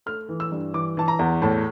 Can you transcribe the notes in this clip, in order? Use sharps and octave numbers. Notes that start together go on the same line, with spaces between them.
A3 F6
E3
E6
G2
E3 D6
E3 A5
A#5
E2
A2 A5